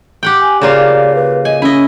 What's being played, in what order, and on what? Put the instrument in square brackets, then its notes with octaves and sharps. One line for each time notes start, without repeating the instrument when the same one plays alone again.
[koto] G4 F#5 G5
[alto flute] G#5
[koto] C#3 A#3 F4 [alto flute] D5
[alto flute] B4
[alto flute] D#5 [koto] G#5
[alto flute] C#4 [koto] E4 D#5